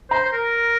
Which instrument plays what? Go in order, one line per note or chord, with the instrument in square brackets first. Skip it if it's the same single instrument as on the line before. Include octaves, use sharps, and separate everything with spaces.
[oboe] C5 [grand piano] A#5
[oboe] C5
A#4